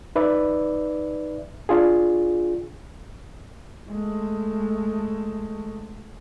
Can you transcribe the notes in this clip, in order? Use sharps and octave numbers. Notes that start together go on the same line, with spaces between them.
D#4 B4 D5 E5
D4 F4 G#4
G#3 A3